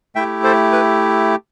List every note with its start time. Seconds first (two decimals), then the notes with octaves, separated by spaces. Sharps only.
0.15 A3 E4 G4 E5 G5
0.44 A4 C5
0.72 B4